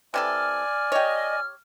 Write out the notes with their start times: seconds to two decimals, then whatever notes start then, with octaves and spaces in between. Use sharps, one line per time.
0.14 C3 E3 A4 D5 G#5 F6
0.92 G4 C#5 D#5